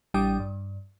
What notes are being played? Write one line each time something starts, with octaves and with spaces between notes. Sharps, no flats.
A1 G3 D4 G5 D#6
G2